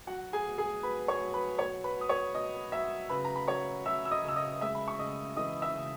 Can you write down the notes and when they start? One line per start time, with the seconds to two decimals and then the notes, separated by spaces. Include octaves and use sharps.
0.07 F#3 F#4 F#5
0.33 G#4 G#5
0.46 B2
0.58 G#4 G#5
0.83 F#3 B4 B5
1.08 C#5 C#6
1.21 F#3
1.34 B4 B5
1.59 B2 C#5 C#6
1.84 B4 B5
1.96 F#3 D#6
2.09 C#5 C#6
2.34 B2 D#5 D#6
2.72 F#3 E5 E6
3.10 C#3 B4 B5
3.24 A#5
3.36 B5
3.48 F#3 C#5 C#6
3.85 F#3 E5 E6
4.05 E6
4.11 D#5 D#6
4.23 C#3
4.28 E6
4.36 D#5 D#6
4.61 G#3 E5 E6
4.75 B5
4.88 C#6
4.99 C#3 D#5 D#6
5.36 E3 D#5 D#6
5.62 E5 E6
5.75 C#3